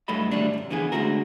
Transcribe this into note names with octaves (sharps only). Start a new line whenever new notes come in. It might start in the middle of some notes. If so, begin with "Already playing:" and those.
G2 F#3 A3 A4 D#5 B5
D#2 G#2 D3 G3 A3 D4
C2 F#2
D3 E3 B3 G#4
D3 D#3 G#3 A3 F#4 A#4